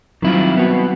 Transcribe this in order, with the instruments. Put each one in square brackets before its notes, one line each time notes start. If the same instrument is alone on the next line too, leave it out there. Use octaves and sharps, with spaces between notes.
[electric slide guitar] D#3 E4 F4 [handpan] F#3 G3 C4
[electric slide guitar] B3 F#4